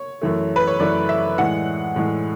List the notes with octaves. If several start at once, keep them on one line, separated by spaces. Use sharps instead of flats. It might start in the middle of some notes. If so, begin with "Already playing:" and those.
Already playing: C#5
F#2 E3 A3
B4
C#5
F#2 E3 A3 D5
E5
A2 E3 G#3 F#5
A2 E3 G#3